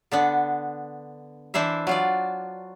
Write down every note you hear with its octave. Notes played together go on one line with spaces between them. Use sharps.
D3 B3 D4
E3 D4 E4 C5 E5
F#3 F4 D5